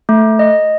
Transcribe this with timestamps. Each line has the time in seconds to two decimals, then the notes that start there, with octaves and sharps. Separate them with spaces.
0.09 A3
0.39 D#5